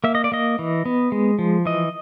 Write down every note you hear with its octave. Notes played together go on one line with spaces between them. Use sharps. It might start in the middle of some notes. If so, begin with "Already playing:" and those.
A#3 E5
D#5
D5
A#3 D#5
E3
B3
G#3
F3
E3 D#5